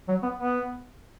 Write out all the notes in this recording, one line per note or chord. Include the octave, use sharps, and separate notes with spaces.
F#3
B3
B3